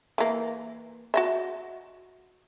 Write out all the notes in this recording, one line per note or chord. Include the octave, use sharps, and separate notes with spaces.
E3 A#3
F#4 D#5 E5